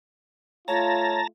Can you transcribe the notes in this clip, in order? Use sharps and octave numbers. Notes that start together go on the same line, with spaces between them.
A3 F4 C#5 A5 A#5